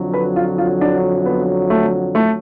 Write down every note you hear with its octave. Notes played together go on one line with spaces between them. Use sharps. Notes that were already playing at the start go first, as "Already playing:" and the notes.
Already playing: F2 D3 F#3
B4
F4
F4
D4
B3
A3
A3